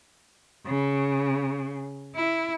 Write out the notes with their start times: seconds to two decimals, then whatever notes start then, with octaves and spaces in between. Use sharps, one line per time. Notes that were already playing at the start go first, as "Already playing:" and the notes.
0.66 C#3
2.15 E4